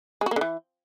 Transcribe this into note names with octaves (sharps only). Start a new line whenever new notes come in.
G#3
F#4
A#3
D3
E3